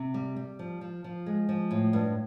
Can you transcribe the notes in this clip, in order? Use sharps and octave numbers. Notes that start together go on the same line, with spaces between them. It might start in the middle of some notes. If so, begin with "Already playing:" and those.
Already playing: C3
G3
G3
F3
F3
F3
G#3
F3
A2
G2